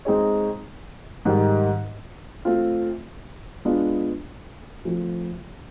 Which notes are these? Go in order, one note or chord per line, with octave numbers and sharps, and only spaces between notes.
G#3 C4 D#4 G#4 C#5
G#2 D#3 G3
A3 C4 F4
G#3 B3 D4 F4
F3 A3 C4